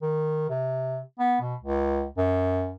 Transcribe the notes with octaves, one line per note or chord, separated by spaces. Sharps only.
D#3
C3
B3
B2
C#2
F#2